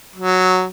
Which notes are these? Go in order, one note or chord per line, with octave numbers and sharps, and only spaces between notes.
F#3